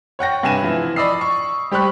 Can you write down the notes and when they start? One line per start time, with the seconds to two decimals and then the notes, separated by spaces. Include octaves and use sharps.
0.19 C#5 F#5 G5 A#6
0.43 G2 C3 G#5 E7
0.63 E3 F3 E4
0.96 D5 D#5 B5 D#6 E6 C7
1.21 C#6
1.71 G3 G4 C5 B5 C#6 F#6